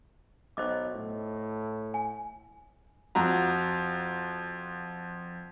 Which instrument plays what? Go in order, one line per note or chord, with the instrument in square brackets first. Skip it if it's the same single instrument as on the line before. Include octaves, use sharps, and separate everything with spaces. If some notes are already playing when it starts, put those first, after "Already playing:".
[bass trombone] B1 [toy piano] C5 D#5 D6
[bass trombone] A2
[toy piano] G#5
[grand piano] F2 F#4 A#5